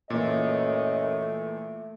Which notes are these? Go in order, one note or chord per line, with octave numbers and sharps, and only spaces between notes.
F#2 A#2 E3 A3 C#5 D#5